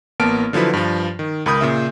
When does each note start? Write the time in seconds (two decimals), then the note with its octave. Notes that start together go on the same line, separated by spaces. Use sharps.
0.20 A1 A#3 B3 A5 F6 D7
0.53 D3 F3 F#3 E4 B4
0.73 G2 F3
1.19 D#3
1.46 C#2 A#4 B5 D#6 G6
1.61 A#2 C#3 E5